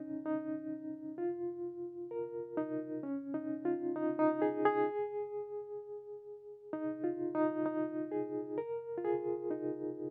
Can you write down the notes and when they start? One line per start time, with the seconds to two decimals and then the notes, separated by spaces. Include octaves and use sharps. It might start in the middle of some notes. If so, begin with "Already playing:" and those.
Already playing: C#4 D#4
0.26 D#4
1.18 F4
2.11 A#4
2.57 D#4
3.03 C#4
3.34 D#4
3.65 F4
3.96 D#4
4.19 D#4
4.42 G#4
4.65 G#4
6.73 D#4
7.04 F4
7.35 D#4
7.66 D#4
8.12 G#4
8.58 A#4
8.98 F4
9.04 G#4
9.51 D#4